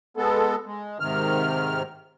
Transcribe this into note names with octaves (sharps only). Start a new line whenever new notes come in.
G#3 B3 A4
G#3
G#2 C3 D#3 F6